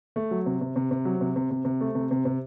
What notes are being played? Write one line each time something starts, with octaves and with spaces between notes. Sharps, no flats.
A3
F#3
C3
C3
C3
C3
F#3
C3
C3
C3
C3
A3
C3
C3
C3